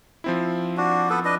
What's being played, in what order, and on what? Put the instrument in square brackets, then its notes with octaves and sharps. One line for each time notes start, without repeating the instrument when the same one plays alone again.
[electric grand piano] F3 C4 E4
[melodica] D4 F#4
B3 A4 B4
D4 B4 D#5